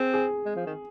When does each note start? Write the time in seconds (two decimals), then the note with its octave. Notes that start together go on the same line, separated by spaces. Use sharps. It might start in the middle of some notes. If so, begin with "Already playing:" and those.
Already playing: C4 G#4
0.14 G#4
0.45 G#3
0.56 F3
0.66 D#3